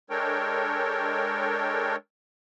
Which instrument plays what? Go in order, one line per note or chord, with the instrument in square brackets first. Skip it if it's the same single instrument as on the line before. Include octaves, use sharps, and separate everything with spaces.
[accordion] G#3 D4 A4 A#4 C#5 G5